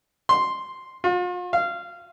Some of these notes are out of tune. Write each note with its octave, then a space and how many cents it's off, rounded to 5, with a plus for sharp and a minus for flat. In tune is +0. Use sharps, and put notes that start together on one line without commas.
C6 +0
F4 +40
F5 -20